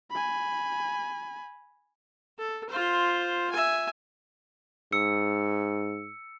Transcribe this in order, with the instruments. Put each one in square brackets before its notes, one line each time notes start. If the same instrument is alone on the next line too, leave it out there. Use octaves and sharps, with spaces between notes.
[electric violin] G#5 B5
[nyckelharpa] A4
F4 C5
E5 G#5
[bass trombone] G#2 [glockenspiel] E6 C#7